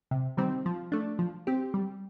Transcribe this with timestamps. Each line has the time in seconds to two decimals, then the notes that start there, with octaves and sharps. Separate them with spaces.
0.11 C3
0.37 D#3 G3 C4
0.66 F3
0.92 A3 D4
1.19 F3
1.47 C4 G4
1.74 G3